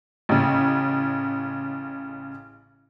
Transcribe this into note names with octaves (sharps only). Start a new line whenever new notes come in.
A1 C#3